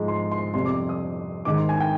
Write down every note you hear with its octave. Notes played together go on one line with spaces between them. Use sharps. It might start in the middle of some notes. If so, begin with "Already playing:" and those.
Already playing: G#2 F3 G#3
C6
C6
F2 C3 G3 C6
D6
D#6
G#2 D#3 G#3 D6
C6
G#5
G5